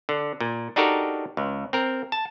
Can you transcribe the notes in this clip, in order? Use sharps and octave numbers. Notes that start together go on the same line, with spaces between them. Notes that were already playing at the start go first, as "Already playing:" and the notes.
D3
A#2
D4 D#4 F#4 G4 A4 A#4
C#2
C4 A#4
A5